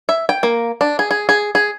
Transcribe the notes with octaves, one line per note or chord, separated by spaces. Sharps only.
E5
G5
A#3
D4
G#4
G#4
G#4
G#4